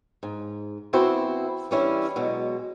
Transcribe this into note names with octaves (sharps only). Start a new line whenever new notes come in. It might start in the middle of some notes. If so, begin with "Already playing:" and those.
G#2
E2 B3 C4 E4 F#4 C5
E3 G3 C#4 D4 E4
B2 F#3 G#3